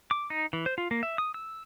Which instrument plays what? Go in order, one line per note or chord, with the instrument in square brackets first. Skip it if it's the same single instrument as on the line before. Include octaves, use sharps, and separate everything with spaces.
[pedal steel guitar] D6
D#4
E3
C5
F4
A#3
E5
D#6
E6